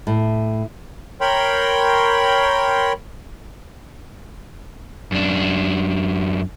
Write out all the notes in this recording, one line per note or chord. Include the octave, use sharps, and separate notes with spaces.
A2
A#4 C#5 G5 B5 C6
F#2 D4